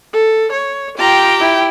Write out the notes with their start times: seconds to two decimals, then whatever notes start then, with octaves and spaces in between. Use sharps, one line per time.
0.13 A4
0.52 C#5
0.98 F4 G4 G5 A#5
1.40 E4